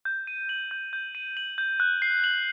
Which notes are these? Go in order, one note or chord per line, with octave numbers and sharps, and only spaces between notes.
G6
D#7
F#7
G6
G6
D#7
F#7
G6
F#6
C7
F#7